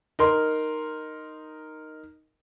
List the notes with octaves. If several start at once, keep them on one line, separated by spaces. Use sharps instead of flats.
D#4 A#4 C6